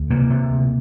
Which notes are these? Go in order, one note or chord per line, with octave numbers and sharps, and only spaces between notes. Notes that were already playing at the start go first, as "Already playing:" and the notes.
Already playing: D2
C3 A#3
C3
D2